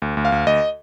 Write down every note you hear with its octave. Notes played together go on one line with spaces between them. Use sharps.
D2
D2
F5
D2
D2 D#5